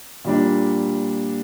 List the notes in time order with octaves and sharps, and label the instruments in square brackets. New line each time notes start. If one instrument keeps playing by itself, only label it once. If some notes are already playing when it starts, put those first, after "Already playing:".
[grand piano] A#2 G3 D4